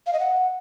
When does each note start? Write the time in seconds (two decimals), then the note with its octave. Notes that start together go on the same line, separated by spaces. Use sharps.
0.06 F5
0.13 D#5
0.20 F#5